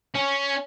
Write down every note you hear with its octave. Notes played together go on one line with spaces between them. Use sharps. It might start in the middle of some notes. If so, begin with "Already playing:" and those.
C#4